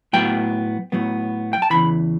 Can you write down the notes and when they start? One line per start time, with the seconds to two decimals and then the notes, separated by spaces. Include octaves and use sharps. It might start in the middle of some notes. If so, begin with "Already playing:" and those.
0.13 A2 F#3 B3 G5
0.92 A2 F#3 B3
1.53 G5
1.62 A5
1.70 E2 C#3 E3 B5